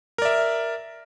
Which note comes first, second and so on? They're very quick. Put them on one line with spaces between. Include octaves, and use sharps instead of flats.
A#4 D5 E5